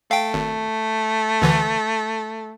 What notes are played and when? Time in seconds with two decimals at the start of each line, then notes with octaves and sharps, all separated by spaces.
0.11 A3 F5 G5
0.34 G#1
1.42 D2 D3 E3